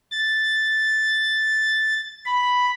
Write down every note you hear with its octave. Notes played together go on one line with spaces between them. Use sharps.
A6
B5